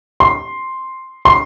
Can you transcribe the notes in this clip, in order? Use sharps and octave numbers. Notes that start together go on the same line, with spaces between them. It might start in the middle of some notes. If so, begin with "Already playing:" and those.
C6
C6